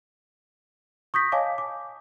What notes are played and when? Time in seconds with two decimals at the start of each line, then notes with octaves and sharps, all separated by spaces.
1.14 C#6 D#6 G6 A#6 B6
1.32 C#5 D#5 F5 G#5 A5 D6
1.58 D6